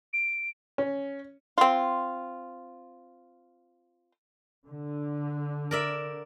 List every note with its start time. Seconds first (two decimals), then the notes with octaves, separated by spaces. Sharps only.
0.13 D7
0.78 C#4
1.58 C4 F4
4.67 D3
5.71 A#4 D5 E5